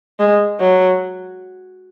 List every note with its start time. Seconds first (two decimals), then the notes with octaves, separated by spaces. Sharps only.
0.20 G#3
0.60 F#3